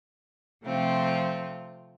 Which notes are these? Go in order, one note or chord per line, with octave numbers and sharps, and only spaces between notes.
C3 F3 A3 C4 F4